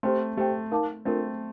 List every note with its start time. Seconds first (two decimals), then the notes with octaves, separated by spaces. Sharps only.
0.03 A3 C4 G4 C5 G5 C6
0.37 A3 G4 C5 G5
0.71 D#4 A#4 F5 A5 D6
1.05 A3 C4 D4 F4 A#4